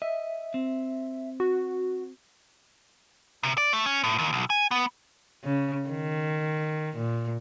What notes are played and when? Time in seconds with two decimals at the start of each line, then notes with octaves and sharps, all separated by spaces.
0.02 D#5 E5
0.54 C4
1.40 F#4
3.43 C3
3.58 D5
3.73 A3
3.86 C#4
4.03 A2
4.18 D#2
4.33 B1
4.50 G#5
4.71 B3
5.44 C#3
5.89 D#3
6.96 A#2